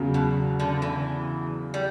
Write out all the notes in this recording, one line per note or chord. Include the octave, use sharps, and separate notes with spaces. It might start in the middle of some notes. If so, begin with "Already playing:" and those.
Already playing: E2 C#3 F#3
B2
D3
E3
G3